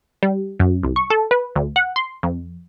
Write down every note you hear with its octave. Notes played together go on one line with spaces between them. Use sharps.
G3
F#2
C2
C#6
A4
B4
D2
F#5
C6
F2